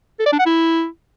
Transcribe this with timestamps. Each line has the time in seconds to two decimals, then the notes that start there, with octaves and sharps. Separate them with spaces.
0.19 A4
0.26 D5
0.33 D4
0.39 F#5
0.46 E4